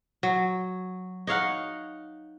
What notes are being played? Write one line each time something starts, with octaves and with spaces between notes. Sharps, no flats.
F#3
D#4 C#5 F5 F#5